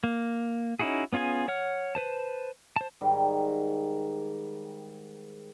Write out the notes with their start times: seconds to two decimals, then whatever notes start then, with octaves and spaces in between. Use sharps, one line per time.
0.04 A#3
0.79 C#4 D#4 E4 F#4 G#4
1.13 B3 C#4 F4 G#4 G#5
1.48 C#5 F#5 F6
1.95 B4 C5 A5
2.76 C5 A5
3.01 G#2 D#3 G3